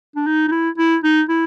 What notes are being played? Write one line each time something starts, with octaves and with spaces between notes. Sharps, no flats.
D4
D#4
D#4
E4
E4
D#4
E4